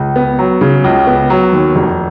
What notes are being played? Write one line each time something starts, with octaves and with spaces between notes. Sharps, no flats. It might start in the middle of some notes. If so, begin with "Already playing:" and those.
Already playing: C#2
B3
F#3
C#3
C#2
B3
F#3
D#2
F1